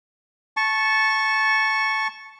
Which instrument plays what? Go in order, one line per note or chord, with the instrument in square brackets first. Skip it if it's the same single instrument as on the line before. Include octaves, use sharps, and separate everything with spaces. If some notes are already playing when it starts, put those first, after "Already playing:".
[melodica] A5 C#6